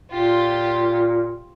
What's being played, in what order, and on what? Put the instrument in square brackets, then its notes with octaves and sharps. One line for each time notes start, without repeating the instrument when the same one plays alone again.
[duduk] A#2 [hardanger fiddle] F4 G4